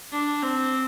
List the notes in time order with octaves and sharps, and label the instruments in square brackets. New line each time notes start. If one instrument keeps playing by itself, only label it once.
[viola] D4
C4